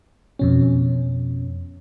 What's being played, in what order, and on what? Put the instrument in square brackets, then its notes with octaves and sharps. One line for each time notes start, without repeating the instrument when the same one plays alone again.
[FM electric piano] F2 B2 C#4